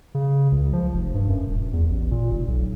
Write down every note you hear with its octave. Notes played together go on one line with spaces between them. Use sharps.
C#3
C#2
F3
F1
G2
F#2
D#1
E2
A1
A#2
F1
B1